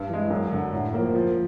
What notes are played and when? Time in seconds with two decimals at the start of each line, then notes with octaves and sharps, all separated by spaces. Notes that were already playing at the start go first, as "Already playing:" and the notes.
Already playing: G2
0.09 E3 G#3
0.30 F#2
0.52 D3 F#3
0.73 A2
0.93 F3 A#3
1.15 F3